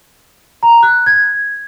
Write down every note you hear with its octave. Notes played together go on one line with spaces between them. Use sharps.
A#5
F#6
G#6